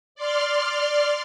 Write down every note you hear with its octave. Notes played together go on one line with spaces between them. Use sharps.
D5 C6 F6